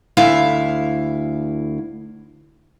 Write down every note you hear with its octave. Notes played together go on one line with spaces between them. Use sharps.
D2 E4 F5